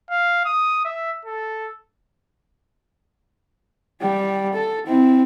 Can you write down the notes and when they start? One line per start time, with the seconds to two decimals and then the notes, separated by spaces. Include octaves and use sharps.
0.10 F5
0.45 D#6
0.85 E5
1.25 A4
4.01 G3 G5
4.53 A4
4.87 C4 E4